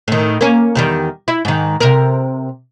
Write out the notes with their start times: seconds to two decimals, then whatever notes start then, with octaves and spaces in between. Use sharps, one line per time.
0.08 A2 D#3
0.41 A#3 C#4
0.75 E2 D#3 G3
1.28 E4
1.45 G#2 D#3
1.80 C3 A#4